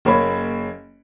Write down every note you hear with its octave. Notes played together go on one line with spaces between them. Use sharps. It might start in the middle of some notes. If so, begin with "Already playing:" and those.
F#1 A#3 C#5 B5